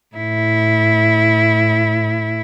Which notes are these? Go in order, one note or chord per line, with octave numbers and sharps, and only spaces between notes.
A2 E4